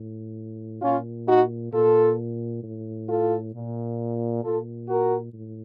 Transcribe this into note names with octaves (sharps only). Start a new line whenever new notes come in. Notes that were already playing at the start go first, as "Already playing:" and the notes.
Already playing: A2
A#2 C#4 F4
D#4 F#4
A#2 F4 A4
A2
F4 A4
A#2
A#2 F4 A4
F#4 A#4
A2